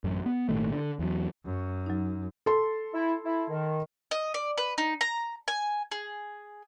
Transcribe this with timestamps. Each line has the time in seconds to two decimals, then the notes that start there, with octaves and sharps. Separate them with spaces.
0.04 A1 F#2
0.26 B3
0.49 G#1 A#2 D#3 A3
0.72 D3
0.99 E2 F#3
1.45 F#2
1.86 F#3 D#4
2.46 A4 C6
2.94 E4
3.25 E4
3.49 D#3
4.11 D#5
4.34 D5
4.58 B4
4.78 D#4
5.01 A#5
5.48 G#5
5.92 G#4